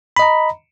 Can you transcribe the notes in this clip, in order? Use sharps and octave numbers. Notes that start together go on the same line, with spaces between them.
D#5 A#5 B5